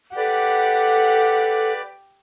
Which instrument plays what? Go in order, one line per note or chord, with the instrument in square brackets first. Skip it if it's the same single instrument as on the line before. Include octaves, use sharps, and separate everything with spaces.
[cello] G4 [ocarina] A4 [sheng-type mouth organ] B4 D5 [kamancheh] F#5